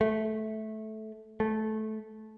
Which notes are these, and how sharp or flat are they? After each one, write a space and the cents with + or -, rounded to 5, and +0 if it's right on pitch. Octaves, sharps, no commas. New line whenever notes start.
A3 -15
A3 -15